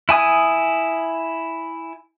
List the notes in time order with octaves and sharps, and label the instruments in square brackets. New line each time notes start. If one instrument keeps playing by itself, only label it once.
[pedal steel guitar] E4 G#5 D#6